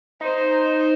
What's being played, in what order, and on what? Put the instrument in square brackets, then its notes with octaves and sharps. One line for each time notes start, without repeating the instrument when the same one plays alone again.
[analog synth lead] D#4 [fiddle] C5